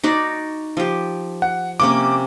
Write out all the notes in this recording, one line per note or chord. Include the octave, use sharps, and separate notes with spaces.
D#4 F#4 D5
F3 G4
F#5
C3 A#3 C#4 D6